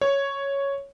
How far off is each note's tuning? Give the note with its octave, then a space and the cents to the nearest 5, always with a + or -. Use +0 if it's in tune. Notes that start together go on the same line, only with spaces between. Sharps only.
C#5 +0